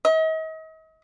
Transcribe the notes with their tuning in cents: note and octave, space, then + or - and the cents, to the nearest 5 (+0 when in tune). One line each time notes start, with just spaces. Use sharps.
D#5 +40